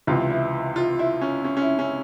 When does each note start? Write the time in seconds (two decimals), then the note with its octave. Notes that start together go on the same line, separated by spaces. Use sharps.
0.07 C#2 C3 E3 F4
0.30 E4
0.76 F4
0.99 E4
1.21 C#4
1.44 C#4
1.57 C#4
1.62 E4
1.79 C#4